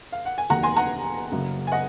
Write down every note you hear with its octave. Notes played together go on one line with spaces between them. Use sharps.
F5
F#5
G#5
F1 D#2 D#3 F#3 A#3 F#5 A#5
G#5 C6
F#5 A#5
F#1 F#2 C#3 F#3 A#3
G#5
D#5 F#5